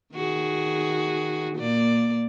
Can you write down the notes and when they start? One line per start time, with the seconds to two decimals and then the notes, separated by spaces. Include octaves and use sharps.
0.14 D#3 F#4 G#4
1.56 A#2 A#3 D5